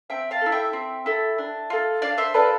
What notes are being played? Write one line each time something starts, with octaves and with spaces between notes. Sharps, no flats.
C4 E5 G5
F5 A5
E4 A4
E5 G5
C4
E4 A4
D4
F4 A4
D4 D5 F5
C5 E5
F4 A4 B4 D5